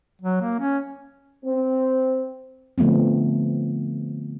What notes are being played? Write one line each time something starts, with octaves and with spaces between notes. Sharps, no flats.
F#3
A#3
C#4
C4
D3 F3 A3 B3 C4